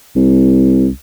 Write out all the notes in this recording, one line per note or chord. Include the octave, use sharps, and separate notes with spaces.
C2